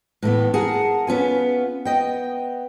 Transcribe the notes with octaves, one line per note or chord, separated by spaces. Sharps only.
A2 E3 A3 B3
G#4 A#4 F#5 G#5 A5
B3 C#4 F4 G#5
B3 D#5 G5